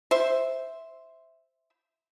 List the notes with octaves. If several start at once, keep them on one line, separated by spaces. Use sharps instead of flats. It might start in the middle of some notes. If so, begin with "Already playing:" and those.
C5 E5